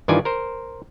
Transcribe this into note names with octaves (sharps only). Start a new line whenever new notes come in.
G2 D#3 E3 F4 D5 G#5
A#4 C5